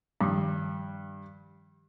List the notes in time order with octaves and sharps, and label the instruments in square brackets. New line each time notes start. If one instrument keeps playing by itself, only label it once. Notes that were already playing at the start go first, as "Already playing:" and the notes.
[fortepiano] G2 [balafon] D#3 F3